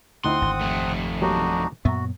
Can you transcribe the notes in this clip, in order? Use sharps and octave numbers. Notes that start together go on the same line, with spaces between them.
D2 C4 D#4 E4 F#5 C6 D#6
G#1
F2 A3
F#3 G3 A#3 D4 D#4 F#4
F#2 A#2 B3 F#4 E5 A#5